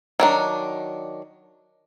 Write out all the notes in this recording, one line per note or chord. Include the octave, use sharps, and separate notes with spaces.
D#3 F#3 D4